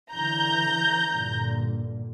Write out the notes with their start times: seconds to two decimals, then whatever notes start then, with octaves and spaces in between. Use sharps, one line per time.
0.11 D3 E3 A#5 G6
1.11 G2 A#2 D3